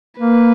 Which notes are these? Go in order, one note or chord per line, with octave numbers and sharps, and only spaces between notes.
A#3 B4